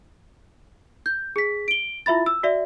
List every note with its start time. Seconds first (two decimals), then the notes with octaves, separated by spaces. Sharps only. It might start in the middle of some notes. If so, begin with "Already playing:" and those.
1.06 G6
1.36 G#4 B6
1.68 D7 G7
2.06 E4 F4 E5 B5 A6
2.26 E6
2.43 F#4 D5 E5